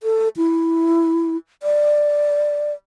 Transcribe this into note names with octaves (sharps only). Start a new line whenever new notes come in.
A4
E4
D5